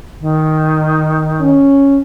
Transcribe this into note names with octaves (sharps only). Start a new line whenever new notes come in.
D#3
C#4